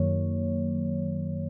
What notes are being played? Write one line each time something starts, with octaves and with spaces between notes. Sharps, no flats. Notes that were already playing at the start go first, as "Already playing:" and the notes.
Already playing: F#2 D#3 F#3 A#3 C#5